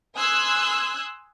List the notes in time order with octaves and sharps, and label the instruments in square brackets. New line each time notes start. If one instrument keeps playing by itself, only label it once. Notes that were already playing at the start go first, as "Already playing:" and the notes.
[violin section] G#5 C6 D#6 E6 F#6 G#6